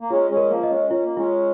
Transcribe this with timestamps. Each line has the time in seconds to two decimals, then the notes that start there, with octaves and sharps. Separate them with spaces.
0.01 A#3
0.10 G#3 C#4 F4
0.30 G#3 C#4
0.37 A#4
0.50 F3 A#3
0.63 D#5
0.70 G#3 C#4
0.90 C#4 F4
1.04 A#3
1.17 G#3 C#4 F4